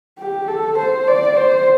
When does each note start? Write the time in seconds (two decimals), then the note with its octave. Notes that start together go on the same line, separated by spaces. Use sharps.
0.19 G4
0.48 A4
0.78 C5
1.07 D5
1.36 C5